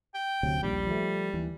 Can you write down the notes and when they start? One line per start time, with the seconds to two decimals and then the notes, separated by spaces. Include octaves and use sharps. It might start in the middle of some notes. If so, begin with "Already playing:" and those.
0.14 G5
0.43 D2 C3 F#3
0.63 A#1 D#2 G3
0.87 F3 A3
1.33 D#2 E3